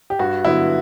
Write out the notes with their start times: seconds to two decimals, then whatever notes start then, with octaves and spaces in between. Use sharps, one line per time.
0.10 G4
0.19 G2 F#4
0.45 D3 F#3 B3 E4